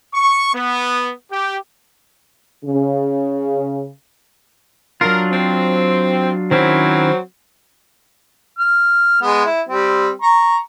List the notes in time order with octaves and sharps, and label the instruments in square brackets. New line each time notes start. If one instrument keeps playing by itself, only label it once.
[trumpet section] C#6
B3
G4
[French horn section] C#3
[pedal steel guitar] F#3 D4 F4 [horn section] A#4
[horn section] C4
[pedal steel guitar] D#3 C#4 E4 [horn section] F#3 C4
[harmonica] F6
G#3 B3
E4
G3 C4
A#5 C#6